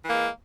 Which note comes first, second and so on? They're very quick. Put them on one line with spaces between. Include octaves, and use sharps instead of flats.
E3 A#3 G#3